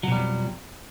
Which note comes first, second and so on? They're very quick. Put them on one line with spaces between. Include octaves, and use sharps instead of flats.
F#3 B2 G3 F2